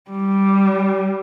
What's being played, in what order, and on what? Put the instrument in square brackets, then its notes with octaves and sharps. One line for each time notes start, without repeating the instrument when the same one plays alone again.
[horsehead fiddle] G3